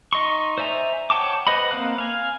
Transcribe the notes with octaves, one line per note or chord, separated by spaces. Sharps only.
D#4 D#5 C6 C#6
C5 D5 E5 G#5 A#5
C#5 F#5 G5 A5 D6
B4 C5 D#5 F#5 B5
A#3 C4 F5 F#6
F5 G#5